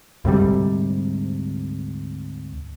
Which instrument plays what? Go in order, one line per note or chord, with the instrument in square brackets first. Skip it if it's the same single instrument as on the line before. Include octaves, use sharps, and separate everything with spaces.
[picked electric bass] D2 G#2 C3 G3